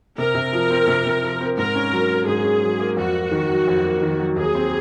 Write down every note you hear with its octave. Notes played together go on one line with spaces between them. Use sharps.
C3 A#4
C3
F3
C4
C3
C3
F3
C4
G#2 A#4
C#4
F#3
A#3
G#2 G#4
C#4
F#3
A#3
F2 F#4
A#3
D#3
F#3
F2
A#3
D#3
F#3
D#2 G#4
C4